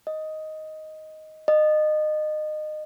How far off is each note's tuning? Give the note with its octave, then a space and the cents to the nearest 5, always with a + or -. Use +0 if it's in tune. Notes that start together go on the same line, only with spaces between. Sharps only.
D#5 +5
D#5 -25